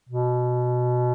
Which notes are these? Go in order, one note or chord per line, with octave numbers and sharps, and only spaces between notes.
B2